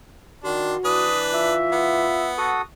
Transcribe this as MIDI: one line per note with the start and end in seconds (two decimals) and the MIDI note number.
0.44 0.77 51
0.44 0.73 62
0.44 1.08 66
0.44 0.77 84
0.85 2.06 52
0.85 1.54 62
0.85 1.54 71
0.85 1.19 87
1.34 2.37 65
1.34 2.30 76
1.72 2.54 59
2.38 2.62 66
2.38 2.62 69
2.38 2.62 87